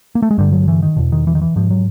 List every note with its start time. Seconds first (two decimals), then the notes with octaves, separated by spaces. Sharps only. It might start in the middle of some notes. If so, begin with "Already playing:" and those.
0.15 A#3
0.22 A3
0.31 G#3
0.38 G2 D3 G3
0.52 F#3
0.68 E3
0.82 D#3
0.96 E2 B2
1.12 D#3
1.27 E3
1.35 D#3
1.42 E3
1.56 G#2 F3
1.70 F#3